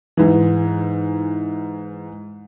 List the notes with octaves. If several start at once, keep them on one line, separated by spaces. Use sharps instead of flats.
G#2 E3